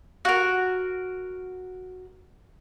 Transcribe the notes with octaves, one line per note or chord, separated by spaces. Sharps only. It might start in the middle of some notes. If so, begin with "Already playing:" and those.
F#4 A#4